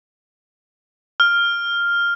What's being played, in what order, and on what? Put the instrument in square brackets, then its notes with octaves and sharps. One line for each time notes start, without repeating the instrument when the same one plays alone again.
[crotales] F6